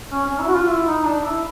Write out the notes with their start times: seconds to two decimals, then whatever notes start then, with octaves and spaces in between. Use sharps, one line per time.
0.12 C#4
0.26 C#4
0.40 E4
0.48 F#4
0.54 F4
0.68 E4
0.87 D#4
1.05 D4
1.24 E4